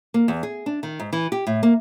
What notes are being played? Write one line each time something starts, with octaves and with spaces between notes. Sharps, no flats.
A#3
E2
G#4
D4
D#3
G#2
E3
G4
A2
A#3